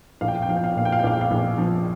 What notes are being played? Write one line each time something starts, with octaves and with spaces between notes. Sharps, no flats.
A#1 F5
G5
F5
G5
F3 F5
G5
F5
G5
A#2 F5
G5
F5
G5
A#1 F5
G5
F5
A#1
F3